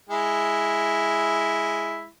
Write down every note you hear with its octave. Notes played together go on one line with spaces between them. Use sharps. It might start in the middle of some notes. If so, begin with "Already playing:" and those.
G#3 E4